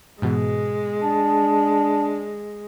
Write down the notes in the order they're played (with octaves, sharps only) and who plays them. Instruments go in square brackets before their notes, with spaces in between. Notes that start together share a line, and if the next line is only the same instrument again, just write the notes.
[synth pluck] G#2 B2 E3 [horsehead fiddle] G#3
[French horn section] D4 [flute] A5